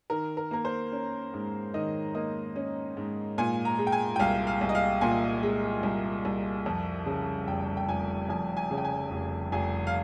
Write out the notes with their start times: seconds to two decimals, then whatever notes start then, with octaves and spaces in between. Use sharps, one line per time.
0.10 D#3 A#4
0.37 A#4
0.51 A#3 A#4
0.65 C5
0.92 C#4
1.34 G#2
1.74 D#3 D#5
2.15 A#3 D#5
2.56 C#4
2.97 G#2
3.38 A#2 G#5
3.65 A#5
3.79 G#3
3.87 G5
3.92 G#5
4.16 G5
4.20 C2 F5
4.47 F5
4.61 C2
4.69 D#5
4.75 F5
5.01 A#2 G#5
5.43 G#3
5.83 C2
6.25 C2
6.66 F2
7.06 C#3
7.47 F1 G5
7.77 G5
7.88 F1 G#5
8.29 F2 G#5
8.57 G#5
8.71 C#3
8.78 G5
8.85 G#5
9.11 F1
9.52 F1 G#5
9.87 F5